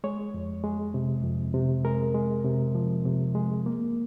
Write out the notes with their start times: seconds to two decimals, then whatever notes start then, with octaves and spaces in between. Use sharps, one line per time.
0.04 G#3 C#5
0.34 F2
0.64 G#3
0.94 C3
1.24 F2
1.54 C3
1.84 G#3 A#4
2.15 G#3
2.44 C3
2.75 F3
3.05 C3
3.35 G#3
3.66 A#3